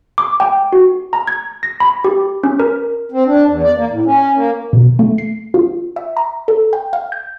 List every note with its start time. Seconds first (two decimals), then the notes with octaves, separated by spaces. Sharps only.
0.18 D6
0.40 G5
0.73 F#4
1.13 A#5
1.27 G#6
1.63 A#6
1.80 B5
2.04 G4
2.44 C#4
2.60 A#4
3.12 C4
3.26 D4
3.46 E2
3.64 D5
3.76 A#3
3.91 A2
4.05 C#4
4.35 A#3
4.73 B2
4.99 A3
5.18 C7
5.54 F4
5.96 E5
6.17 A#5
6.48 A4
6.73 G5
6.93 F5
7.12 G6